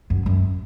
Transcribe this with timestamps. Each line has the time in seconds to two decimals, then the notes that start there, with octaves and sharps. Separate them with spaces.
0.10 F#2
0.26 F#2